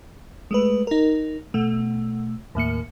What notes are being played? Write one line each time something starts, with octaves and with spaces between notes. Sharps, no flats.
G#3 A3 B4
D#4 A#4
B2 A3
D#2 A2 A#3 C#7